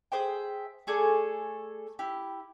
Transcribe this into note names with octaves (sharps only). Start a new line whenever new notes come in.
G#4 C5 E5 G5
A3 G#4 A4 D5
E4 G4